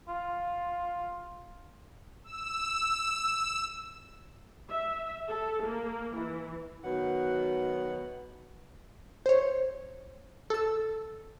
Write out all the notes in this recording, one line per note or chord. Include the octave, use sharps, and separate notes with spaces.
F4
E6
E5
A4
A#3
E3
B2 D#3 F#3 B3 F#5
C5 C#5
A4 E6